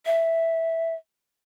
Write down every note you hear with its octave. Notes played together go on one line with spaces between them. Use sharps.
E5